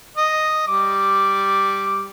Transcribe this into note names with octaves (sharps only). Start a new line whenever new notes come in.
D#5
G3 D6